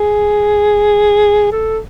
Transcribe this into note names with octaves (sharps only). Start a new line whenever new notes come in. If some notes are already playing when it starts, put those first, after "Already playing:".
Already playing: G#4
A4